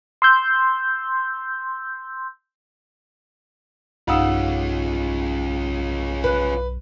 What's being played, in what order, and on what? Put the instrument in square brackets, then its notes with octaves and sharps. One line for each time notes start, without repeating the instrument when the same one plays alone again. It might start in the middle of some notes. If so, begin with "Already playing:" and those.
[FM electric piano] C6 E6 G6
[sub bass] B1 [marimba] G2 D#4 [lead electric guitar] C#4 F4 [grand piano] F5 F#5 E6
[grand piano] B4 [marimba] F#6